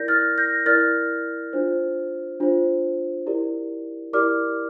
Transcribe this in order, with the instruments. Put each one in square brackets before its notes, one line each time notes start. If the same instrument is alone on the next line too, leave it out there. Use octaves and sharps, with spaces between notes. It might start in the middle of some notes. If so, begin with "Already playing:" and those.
Already playing: [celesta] E4 A#4 D5 G6 A#6
F6 A6
G6 A#6
E4 A#4 D5 F6 A6
D4 F4 C5
D4 F4 C5
E4 G4 A#4 D5
E4 G4 A#4 D5 D6 F6